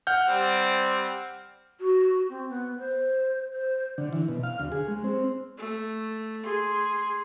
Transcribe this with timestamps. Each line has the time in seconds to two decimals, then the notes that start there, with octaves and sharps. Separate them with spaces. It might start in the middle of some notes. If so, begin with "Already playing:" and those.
0.07 F#5 F6 G6
0.26 G3 C4
1.80 F#4
2.29 C4
2.49 B3
2.78 C5
3.54 C5
3.98 D3
4.13 E3
4.28 B2
4.43 F5
4.59 D2
4.72 G#4
4.88 G#3
5.04 C4
5.58 A3
6.45 G#4 C6